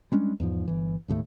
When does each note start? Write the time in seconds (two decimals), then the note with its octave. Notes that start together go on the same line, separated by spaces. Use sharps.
0.12 G3 G#3 C#4 D4
0.40 E2 G#2 F3
0.68 G1 E3
1.08 E1 D#2 A2 A3